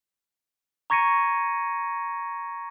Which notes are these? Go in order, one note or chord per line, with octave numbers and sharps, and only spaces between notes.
A#5 C#6 G#6 A#6 C#7 D#7